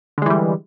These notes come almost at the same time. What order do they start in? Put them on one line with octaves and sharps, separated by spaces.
D3 G#3 E3 G3